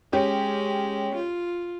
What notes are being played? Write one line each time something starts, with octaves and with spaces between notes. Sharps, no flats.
G#3 C#4 G4
F4